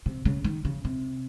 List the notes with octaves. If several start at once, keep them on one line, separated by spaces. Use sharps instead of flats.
C3
C#3
D#3
C#3
C3